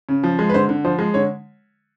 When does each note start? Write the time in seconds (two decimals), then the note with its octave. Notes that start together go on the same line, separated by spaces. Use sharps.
0.09 C#3
0.24 F3
0.39 G#3
0.49 B4
0.54 D3 C5
0.69 D3
0.85 F3 C5
0.99 G#3
1.14 D3 C#5